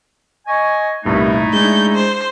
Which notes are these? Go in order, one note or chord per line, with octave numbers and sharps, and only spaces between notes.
D#5 G#5 C#6
C2 G2 A#2 A3 D#4 E4
G#3 D4 G6
C5